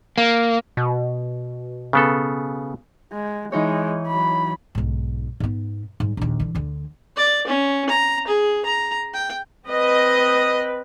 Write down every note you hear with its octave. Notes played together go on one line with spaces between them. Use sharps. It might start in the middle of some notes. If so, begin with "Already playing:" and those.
A#3
B2
C#3 B3 A4
G#3
E3 G#3 D#4 C#5
F#3 B5
B1 G#2
G#2 B3
G#2 G3
A#1 D#2
D3 E3
D2 D3
D5
C#4
A#5
G#4
A#5
G5
C4 B4 D#5